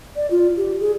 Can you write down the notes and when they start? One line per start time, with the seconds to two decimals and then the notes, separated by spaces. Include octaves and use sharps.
0.16 D5
0.31 F4
0.57 G4
0.81 G#4